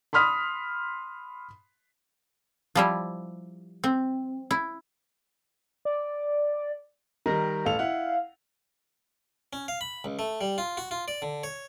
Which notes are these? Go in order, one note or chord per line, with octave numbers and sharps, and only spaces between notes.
B5 C6 D#6 F6 B6
F3 G3 E4
C4
E4
D5
D#3 G3 A#5
A1 A4 F5 F7
E4 F#5
C#4
F5
B5
C#2
A3
G3
F4
F#4
F4
D5
D3
C#5